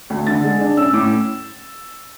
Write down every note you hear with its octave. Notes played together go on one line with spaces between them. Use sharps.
D2
D3 A6
G#3
D4
C#4 E6
A2 D6